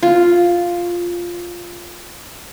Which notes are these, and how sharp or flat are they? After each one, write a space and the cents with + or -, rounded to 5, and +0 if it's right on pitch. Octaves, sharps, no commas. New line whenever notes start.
F4 +0